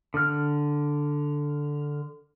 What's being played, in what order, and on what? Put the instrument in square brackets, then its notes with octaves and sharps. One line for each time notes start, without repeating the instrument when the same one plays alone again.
[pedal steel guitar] D3 F6